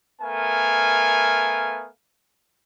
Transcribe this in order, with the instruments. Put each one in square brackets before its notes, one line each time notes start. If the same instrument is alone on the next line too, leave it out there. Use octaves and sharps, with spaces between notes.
[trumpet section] A3 B3 A#4 F5 G#5